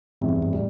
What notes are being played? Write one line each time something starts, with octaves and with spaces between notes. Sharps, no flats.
F1 E2 A2 C3
G2
G2
A2 G3